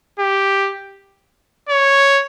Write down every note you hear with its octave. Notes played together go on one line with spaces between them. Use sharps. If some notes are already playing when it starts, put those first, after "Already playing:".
G4
C#5